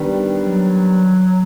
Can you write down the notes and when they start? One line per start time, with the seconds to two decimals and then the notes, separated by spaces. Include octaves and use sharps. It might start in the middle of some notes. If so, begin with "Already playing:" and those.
Already playing: D#3 G3 B3 D4
0.44 F#3